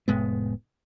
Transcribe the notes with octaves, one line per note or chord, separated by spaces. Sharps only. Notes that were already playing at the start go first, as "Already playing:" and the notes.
F1 A2 G#3 B3